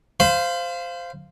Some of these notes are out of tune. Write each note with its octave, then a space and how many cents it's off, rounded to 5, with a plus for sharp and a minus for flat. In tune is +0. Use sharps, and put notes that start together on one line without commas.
C5 -10 F5 -10 B5 +35